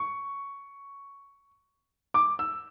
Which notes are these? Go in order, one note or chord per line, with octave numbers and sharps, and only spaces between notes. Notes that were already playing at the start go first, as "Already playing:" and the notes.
Already playing: C#6
D6
E6